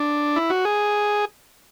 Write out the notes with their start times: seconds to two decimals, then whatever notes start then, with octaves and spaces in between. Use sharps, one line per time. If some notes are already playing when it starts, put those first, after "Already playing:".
Already playing: D4
0.36 E4
0.50 F#4
0.65 G#4